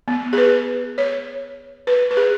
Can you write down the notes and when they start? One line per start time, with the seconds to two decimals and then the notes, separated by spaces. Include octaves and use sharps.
0.08 B3
0.33 G#4
0.38 B4
0.98 C#5
1.87 B4
2.11 B4
2.17 G#4